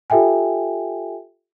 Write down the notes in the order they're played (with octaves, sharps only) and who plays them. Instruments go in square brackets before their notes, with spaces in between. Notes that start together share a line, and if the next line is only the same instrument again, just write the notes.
[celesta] F4 G4 A4 E5 G5 G#5